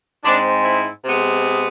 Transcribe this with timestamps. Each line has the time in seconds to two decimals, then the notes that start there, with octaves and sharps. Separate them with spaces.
0.24 G#2 G#3 C4 D4
0.64 E4
1.04 C3 G#3 B3